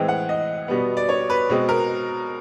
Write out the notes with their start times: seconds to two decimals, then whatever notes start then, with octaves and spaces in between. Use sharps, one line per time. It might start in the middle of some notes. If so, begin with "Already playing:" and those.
Already playing: A2 E3 G#3 C4 G5
0.08 F#5
0.29 D#5
0.68 B2 G3 B3
0.97 D5
1.09 C#5
1.30 B4
1.49 B2 G#3 C4
1.69 A#4